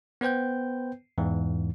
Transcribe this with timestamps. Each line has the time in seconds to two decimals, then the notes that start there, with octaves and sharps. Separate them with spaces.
0.21 B3 B4 C5 G5 G6
1.18 E2 G#2 E3